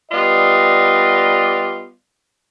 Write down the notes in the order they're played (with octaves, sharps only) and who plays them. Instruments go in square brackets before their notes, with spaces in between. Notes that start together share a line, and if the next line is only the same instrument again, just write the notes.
[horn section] G3 B3 F4 D5 D#5